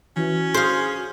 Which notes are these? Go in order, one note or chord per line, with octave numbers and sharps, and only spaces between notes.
E3 C#4 F#4
G#4 C5 F5